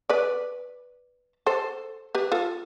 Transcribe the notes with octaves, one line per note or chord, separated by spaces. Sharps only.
B4 D5
A4 C5
G4 B4
F4 A4